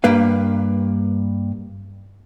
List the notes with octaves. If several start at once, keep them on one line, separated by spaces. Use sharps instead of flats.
G2 A#3 B4 F5